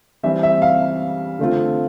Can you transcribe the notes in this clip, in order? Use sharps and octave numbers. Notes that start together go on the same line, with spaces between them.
E3 G3 C4 E5
E5
F5
D3 A3 C4 F4